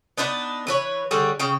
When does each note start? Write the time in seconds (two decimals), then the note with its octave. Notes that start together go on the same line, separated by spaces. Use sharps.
0.17 B3 D4 D#4 B4
0.67 E3 B4 C#5
1.11 D3 G3 C#4 G#4
1.39 C#3 G5